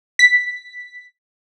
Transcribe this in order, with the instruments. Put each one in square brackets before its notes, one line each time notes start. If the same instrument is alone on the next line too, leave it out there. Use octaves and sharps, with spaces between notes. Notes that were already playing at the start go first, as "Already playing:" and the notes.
[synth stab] B6